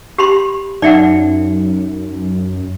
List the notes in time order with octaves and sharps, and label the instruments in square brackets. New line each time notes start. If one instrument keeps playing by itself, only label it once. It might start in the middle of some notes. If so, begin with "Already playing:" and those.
[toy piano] G4 B5 C6
[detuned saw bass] F#2 [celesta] D#4 C#7 [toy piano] D5 E5 F#5